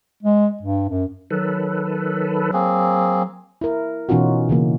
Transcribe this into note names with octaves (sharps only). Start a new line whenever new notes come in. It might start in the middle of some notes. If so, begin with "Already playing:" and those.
G#3
G2
F#2
D#3 F#3 A4 B4
A#3 C4 G#4
E4 A#4
B2 E3 C#4 D#4 F4 F#4
C#3 E3 A#3